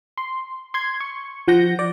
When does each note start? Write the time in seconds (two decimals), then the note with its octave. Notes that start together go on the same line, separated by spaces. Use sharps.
0.18 C6
0.74 C6 G#6
1.00 C#6
1.48 F3 F#5 G6 A#6
1.79 D5